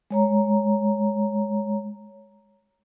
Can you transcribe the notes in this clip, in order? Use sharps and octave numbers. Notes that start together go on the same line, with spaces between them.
G#3 C#5 A#5